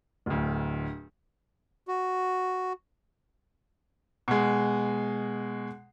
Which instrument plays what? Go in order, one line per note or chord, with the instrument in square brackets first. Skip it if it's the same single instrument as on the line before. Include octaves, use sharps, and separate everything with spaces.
[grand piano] D1 D2
[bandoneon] F#4
[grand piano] B2 G#3